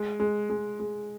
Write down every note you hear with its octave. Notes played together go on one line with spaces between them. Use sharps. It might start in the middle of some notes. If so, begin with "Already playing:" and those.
Already playing: G#3
G#3
G#3
G#3